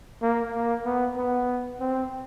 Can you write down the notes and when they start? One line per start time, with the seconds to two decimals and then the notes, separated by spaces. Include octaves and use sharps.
0.22 A#3
0.54 A#3
0.85 B3
1.17 B3
1.80 C4